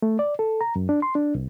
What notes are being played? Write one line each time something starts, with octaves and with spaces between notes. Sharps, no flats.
A3
D5
A4
A#5
F#2
D4
C6
D4
C2